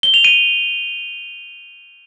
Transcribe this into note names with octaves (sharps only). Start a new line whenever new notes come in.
G7
F7
D#7